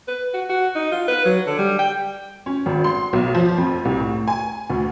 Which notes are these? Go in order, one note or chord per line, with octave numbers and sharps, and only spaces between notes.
B4
F#4
F#4
D#4
F4
B4
F#3
D3
G3
G5
C#4
G#1
C6
B1
F3
F2
C2
A2
G#5
D2